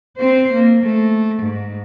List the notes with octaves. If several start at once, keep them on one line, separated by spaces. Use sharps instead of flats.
C4 C5
A#3
A3
G#2